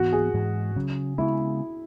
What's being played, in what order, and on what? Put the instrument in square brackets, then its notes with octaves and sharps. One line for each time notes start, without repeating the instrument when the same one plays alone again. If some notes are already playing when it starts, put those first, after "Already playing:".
Already playing: [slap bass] G#2 E3 B3 [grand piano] F#4
[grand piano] G#4
[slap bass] G#2 E3 G#3
C#3 F#3 C#4
[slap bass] C#3 G#3 B3 [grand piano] E4